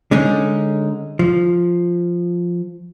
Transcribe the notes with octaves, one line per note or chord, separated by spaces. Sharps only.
D3 G#3 C#4 D#4
F3